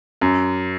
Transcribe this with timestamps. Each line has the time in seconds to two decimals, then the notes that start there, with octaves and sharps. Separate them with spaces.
0.21 F#2